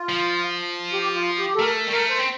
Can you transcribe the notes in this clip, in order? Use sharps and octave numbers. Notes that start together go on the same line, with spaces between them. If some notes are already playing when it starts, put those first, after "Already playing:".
Already playing: F4
F3
G4
F4
G4
A4
A3 A#4
G3
A3 A#4
C5
C4